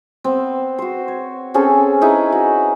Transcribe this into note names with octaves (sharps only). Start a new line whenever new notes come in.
B3 C4
F#4 C5
C#5
C4 C#4 G#4 A4
D#4 E4 G#4 B4
F#4